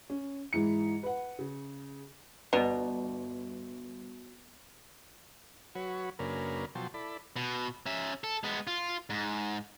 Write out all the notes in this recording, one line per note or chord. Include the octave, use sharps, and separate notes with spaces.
C#4
G#2 E3 C#7
B4 F#5
C#3
G1 B2 B4 D5 A#5
F#3 F#4 B4 C#5
F#2 C#3 A#3 D4 A#4 B4
B2 F3 F#3 G5 A5 C6
E4 A4 D5 B5
B2
C#4 E5
A4
G#3 B3
F4
G#2